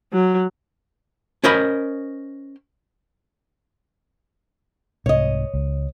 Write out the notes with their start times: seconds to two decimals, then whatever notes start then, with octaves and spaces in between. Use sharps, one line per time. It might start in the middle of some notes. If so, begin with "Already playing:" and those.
0.13 F#3
1.44 C#4 A#4 C5 D#5 B5
5.06 C2 G#2 C3 C#5 D#5
5.54 C#2